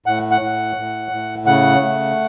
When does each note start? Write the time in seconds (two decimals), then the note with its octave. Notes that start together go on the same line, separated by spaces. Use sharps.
0.06 A2 F#5
0.31 F#5
0.41 A2
0.76 A2
1.11 A2
1.46 C#3 F#5
1.81 A3